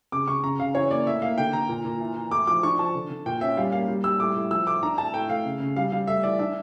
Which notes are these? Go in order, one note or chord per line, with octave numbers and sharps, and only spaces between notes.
C#3 D6
C#3 C#6
C#3 A#5
C#3 F5
E3 C#5
A#3 D5
A2 E5
A#3 F5
D3 G5
D3 A#5
A#2
A#2
E3
E3
A2 D6
F3 D6
D4 C#6
F3 A5
D3
D3
A#2 G5
C#4 E5
G3 F5
A#3 F5
G3
G3 E6
A2 D6
A2
F3 E6
A2 D6
D4 A#5
A2 A5
A2 G5
A3 F5
C#3
C#3
G3 F5
G3 F5
A3 E5
E3 D5
D4 E5